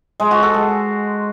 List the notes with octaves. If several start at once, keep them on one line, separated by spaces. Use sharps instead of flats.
G#3
F#4
A4
G#3